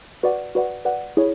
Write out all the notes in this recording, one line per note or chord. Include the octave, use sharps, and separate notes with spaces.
F#4 B4 D5 F#5
F#4 B4 D5 F#5
F#4 B4 D5 F#5
E4 G#4 C#5